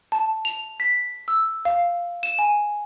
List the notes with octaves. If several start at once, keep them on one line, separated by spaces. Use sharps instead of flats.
A5
F7
B6
E6
F5
E7
G#5